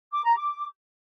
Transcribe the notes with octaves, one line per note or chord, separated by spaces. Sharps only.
D6
A#5
D6